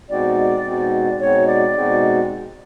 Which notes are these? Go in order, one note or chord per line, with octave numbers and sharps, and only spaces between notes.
B2 G#3 C4 D#4 F#4 D5
B2 G#3 C4 D#4 F#4
B2 G#3 C4 D#4 F#4 C#5
D5
B2 G#3 C4 D#4 F#4